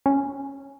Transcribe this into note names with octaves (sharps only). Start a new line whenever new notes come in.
C#4